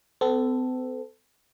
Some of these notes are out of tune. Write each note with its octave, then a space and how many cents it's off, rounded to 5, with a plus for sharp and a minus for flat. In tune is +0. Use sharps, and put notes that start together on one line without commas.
C4 -45 A4 +0